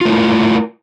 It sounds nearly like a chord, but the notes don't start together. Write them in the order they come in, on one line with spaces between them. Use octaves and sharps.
F4 A3 E4 A#4